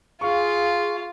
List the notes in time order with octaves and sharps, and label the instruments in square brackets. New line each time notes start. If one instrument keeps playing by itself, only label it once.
[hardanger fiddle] F4 [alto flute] G#4 [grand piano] F5 C#6